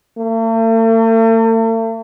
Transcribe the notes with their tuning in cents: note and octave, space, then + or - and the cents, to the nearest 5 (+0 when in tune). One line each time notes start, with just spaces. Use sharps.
A3 +45